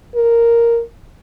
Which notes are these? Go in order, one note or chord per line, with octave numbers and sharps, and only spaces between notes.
A#4